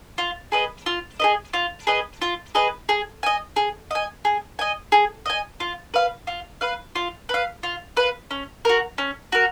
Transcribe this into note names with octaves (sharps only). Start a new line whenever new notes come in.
F4
G#4 B4 D#5
F4
G#4 B4 D#5
F4
G#4 B4 D#5
F4
G#4 B4 D#5
G#4
D#5 G#5
G#4
D#5 G#5
G#4
D#5 G#5
G#4
D#5 G#5
F4
B4 F5
F4
B4 F5
F4
B4 F5
F4
B4 F5
C#4
F#4 A#4
C#4
F#4 A#4